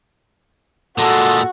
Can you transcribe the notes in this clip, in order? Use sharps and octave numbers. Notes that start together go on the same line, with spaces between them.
A#2 G#3 F#4 A4